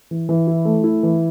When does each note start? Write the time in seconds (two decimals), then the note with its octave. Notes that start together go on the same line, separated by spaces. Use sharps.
0.11 E3
0.29 E3
0.47 E4
0.65 A3
0.84 E4
1.03 E3